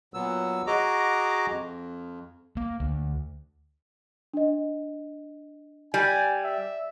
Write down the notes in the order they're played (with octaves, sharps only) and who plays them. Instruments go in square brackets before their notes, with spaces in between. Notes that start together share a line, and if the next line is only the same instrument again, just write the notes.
[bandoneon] A#2 F#3 B3 E6
F#4 G#4 D#5 A#5 D6
F2
[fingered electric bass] A#3
D2
[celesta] D4 D#5
[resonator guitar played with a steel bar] G3 [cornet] G#5
[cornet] E5